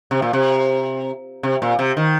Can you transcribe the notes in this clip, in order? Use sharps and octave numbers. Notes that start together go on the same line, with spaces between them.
C3
A#2
C3
C3
A#2
C3
D#3